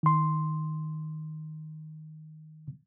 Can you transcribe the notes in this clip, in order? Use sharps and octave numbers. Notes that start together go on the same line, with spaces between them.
D#3 C6